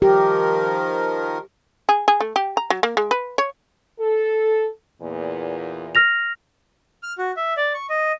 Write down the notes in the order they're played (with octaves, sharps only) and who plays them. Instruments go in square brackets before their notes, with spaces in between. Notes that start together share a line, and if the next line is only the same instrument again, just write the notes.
[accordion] D#3 F3 A#4 [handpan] G4
[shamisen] G#4
G#4
A3
G4
A#5
F#3
A#3
G#3
B4
C#5
[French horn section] A4
E2 A#2
[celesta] F6 A#6 F7
[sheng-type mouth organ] F6
F#4
E5
D5
C#6
D#5